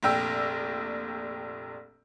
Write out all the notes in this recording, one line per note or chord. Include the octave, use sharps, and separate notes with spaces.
F1 A#1 G5 E6